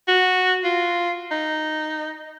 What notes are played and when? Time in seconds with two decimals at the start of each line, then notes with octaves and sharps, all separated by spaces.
0.08 F#4
0.64 F4
1.31 D#4